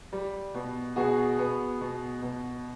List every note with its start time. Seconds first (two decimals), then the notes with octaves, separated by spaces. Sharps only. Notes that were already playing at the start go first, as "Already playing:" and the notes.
0.13 G3
0.55 B2
0.96 B2 F#4 G#4
1.39 B3
1.81 B2
2.22 B2